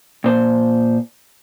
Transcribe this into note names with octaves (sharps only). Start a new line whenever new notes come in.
A#2 C5